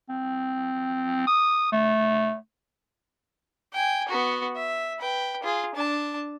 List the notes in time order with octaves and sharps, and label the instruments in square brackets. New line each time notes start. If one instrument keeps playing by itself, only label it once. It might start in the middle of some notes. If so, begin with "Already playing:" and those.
[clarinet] C4
D#6
A3
[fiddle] G5 G#5
B3 F#4
E5
B4 G5
F4 G#4
D4 A5